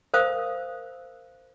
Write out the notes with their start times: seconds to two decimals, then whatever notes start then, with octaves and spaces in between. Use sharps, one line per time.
0.14 A#4 C5 F5 D#6